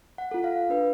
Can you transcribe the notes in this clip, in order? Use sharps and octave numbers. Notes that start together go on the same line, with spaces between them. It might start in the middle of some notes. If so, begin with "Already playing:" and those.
F#5
F4 A4
F5
D4 B4